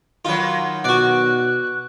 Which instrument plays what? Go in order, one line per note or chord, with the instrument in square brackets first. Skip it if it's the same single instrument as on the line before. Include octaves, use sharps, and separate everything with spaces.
[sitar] D#3 F#3 [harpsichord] F4 B4
[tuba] B2 [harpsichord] F#4 D5 [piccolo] F#6